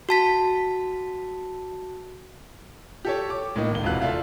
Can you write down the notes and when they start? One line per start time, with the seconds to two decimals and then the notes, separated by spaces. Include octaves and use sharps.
0.09 F#4 A5 B6
3.05 G4 A4 C#5
3.30 D6
3.56 A2 A#3 D#4
3.71 G#1 C#2 G7
3.84 E1 C3 E3 F#4 F5 F#6
4.02 F4 A4 D5 E5 F5